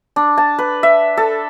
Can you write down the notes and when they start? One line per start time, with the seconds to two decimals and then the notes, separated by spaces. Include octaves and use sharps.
0.16 D4
0.38 A5
0.59 B4
0.83 E5
1.17 A4